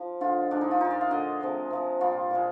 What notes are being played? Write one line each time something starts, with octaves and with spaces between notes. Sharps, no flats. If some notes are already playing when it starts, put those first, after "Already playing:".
Already playing: F3
D3 G#3 F4
A#2 G#3 D4
D#4
F4
A#2 G#3 D#4
D5
F5
D3 G#3 D#5
C3 F3 G#3
C3 F3 G#3
A#2 G3 F4
A#2 F3 G#3